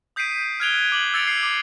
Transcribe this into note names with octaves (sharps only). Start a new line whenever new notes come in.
D#6 G6 B6 C7 D7 D#7
F6 F#6 G#6 D7 F7 G7
D6 F#7
E6 G#6 A6 C#7 D7 F7
C7
D6